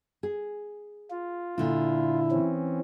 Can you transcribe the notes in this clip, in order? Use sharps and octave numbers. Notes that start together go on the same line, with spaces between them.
G#4
F4
A#2 D3 D4 E4
E3 C4 C#4